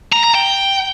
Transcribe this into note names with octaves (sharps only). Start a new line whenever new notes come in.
A#5
A#5
G5